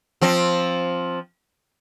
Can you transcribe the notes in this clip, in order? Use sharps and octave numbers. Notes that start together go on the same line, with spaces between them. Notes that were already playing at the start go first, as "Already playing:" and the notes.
F3 C4